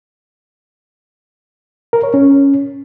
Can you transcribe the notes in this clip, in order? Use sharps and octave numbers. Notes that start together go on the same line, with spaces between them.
A#4
C#5
C#4